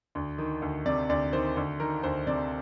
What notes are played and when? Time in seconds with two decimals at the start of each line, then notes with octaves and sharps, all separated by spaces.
0.15 D2
0.38 D#3
0.62 D2
0.86 C3 D5
1.09 D2 D5
1.33 D#3 C5
1.57 D2
1.80 D#3 A#4
2.03 D2 C5
2.27 C3 D5